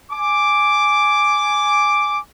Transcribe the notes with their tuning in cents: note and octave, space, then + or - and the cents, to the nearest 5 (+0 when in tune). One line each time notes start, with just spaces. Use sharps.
G#5 +0 D6 +0